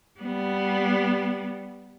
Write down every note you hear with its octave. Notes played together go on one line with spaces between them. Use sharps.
G3 B3